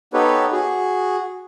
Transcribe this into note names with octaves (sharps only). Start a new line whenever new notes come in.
B3 D#4 G4 A4 B4 C#5
F#4 G#4